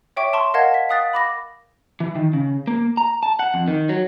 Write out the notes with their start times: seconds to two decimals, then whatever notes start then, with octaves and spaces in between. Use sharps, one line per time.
0.16 C#5 E5 G5 C#6 D6 B6
0.33 A5 C6 C#6
0.54 A#4 D#5 F5 F#5 A5 G#6
0.74 B6
0.89 F5 G5 D#6 F#6 A6 B6
1.13 B5 D6 A#6
2.00 E3
2.16 D#3
2.33 C#3
2.67 A#3
2.97 A#5
3.23 A5
3.39 F#5
3.54 F2
3.68 D#3
3.89 F#3